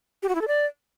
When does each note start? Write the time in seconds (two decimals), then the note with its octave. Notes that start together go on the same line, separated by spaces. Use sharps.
0.23 G4
0.29 F#4
0.35 E4
0.41 A4
0.48 D5